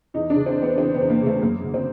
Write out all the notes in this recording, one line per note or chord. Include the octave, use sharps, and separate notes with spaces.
E2 D#4
D4
C#3
C4
E2
B3
E3 C4
B3
E2
A#3
C#3
A3
F#2 A#3
D3
C4